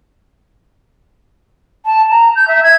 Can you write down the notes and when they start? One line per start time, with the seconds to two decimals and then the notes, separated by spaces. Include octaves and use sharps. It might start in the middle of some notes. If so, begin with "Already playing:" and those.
1.85 A5
2.11 A#5
2.36 G6
2.48 E5
2.63 G#6